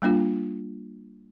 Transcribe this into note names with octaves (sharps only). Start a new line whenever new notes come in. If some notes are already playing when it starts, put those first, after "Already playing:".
G3 A#3 D4 F4